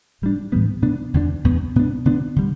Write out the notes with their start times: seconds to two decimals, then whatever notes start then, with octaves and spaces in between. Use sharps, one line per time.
0.22 A2 G3 D4
0.52 A2 E3 G3 B3
0.82 B2 B3 D4
1.14 E2 D3 B3 D4
1.44 E2 B2 B3
1.76 B2 B3 D4
2.05 D3 B3 D4
2.36 D3 G3